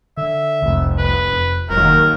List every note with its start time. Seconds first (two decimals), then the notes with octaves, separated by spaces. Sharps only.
0.17 D3 E5
0.62 F1 C2
0.98 B4
1.32 F2
1.70 F1 D#2 F#3 A#4